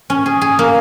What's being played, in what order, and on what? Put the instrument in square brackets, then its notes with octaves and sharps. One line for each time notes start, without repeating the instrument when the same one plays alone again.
[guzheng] C#4
G#4
G#4
A#3